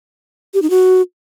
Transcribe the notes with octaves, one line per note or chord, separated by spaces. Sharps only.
G4
D#4
F#4